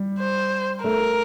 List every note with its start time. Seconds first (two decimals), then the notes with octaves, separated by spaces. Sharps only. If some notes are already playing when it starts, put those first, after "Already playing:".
Already playing: G3
0.19 C5
0.84 A3 A#4